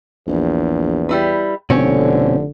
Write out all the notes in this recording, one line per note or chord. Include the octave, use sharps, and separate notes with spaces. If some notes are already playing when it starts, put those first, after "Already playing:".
A#1 E2
G3 E4 B4
F1 B2 D3 C4 C#4 C#5